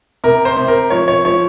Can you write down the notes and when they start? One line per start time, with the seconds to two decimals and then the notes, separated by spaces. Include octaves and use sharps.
0.24 C3 A#4
0.45 C5
0.57 C3
0.68 A#4
0.90 F3 C#5
1.08 C#5
1.25 F3 C#5